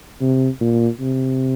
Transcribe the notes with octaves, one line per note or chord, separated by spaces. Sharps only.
C3
A#2
C3